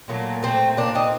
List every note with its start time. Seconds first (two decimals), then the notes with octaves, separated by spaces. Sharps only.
0.08 A#2 F#3 A3 A#3
0.43 A3 C4
0.77 A#3 D4
0.95 C4 D#4